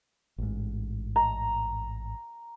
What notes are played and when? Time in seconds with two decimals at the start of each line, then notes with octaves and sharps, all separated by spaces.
0.38 A1 G#2
1.16 A#5